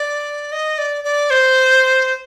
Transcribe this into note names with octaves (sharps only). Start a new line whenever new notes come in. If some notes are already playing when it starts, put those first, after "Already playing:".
Already playing: D5
D#5
D5
D5
C5